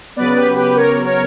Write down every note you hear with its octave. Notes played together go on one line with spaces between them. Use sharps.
C#3 F#3 B3 B4 D5
G4 B4
G4 B4
A#4 C#5
A#4 C#5